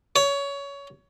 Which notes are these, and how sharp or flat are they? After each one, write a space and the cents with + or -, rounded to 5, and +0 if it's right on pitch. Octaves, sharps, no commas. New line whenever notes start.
C#5 +20